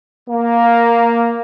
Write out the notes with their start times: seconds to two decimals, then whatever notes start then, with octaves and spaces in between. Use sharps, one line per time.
0.29 A#3